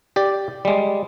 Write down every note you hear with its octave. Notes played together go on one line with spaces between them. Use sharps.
G4 D5
G3 G#3